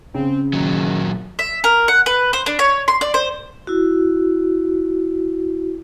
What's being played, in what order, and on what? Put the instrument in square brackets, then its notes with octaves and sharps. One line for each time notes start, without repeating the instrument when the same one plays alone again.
[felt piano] C#3 [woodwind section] C4
[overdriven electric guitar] A#2 F#3 [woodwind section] D#3
[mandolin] E5
A#4
F#5
B4
C5
D4
C#5
C6
D5
C5
[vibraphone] E4 F#4